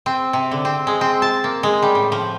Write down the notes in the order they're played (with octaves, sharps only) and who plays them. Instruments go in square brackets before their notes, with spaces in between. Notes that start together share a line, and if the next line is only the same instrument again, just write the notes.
[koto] C4
C3
D3
C4
G#3
C4
A5
A#3
G#3
G3
A2
F3